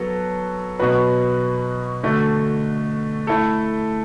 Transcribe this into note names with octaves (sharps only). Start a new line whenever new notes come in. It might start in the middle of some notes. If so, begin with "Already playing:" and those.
Already playing: F#3 B3 F#4 A4
B2 F#3 B3 F#4 B4
D3 A3 F#4
A3 E4 A4